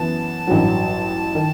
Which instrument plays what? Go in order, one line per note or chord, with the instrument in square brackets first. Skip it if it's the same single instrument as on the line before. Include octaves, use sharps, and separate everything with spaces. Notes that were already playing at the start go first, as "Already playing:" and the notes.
Already playing: [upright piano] F#2 E3 B3 [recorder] A5
[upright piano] A1 G2 F#3
D#3